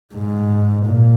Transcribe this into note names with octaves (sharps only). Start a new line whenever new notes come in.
G#2
A#2